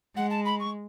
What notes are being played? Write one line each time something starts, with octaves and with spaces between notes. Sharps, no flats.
G#3 F#5
A5
B5
C#6